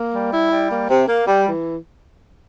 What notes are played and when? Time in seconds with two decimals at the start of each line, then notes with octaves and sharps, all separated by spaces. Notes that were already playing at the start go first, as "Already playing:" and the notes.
Already playing: A#3
0.13 G3
0.32 E4
0.50 G3
0.69 A#3
0.88 C3
1.07 A#3
1.26 G3
1.46 E3